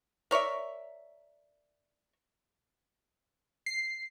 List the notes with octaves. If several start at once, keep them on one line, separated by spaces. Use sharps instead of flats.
A#4 C#5 D5 E5
C7